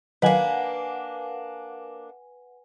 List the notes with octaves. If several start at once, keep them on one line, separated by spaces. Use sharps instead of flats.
D#3 F#3 A#3 D4 D#4 B4 F#5 G#5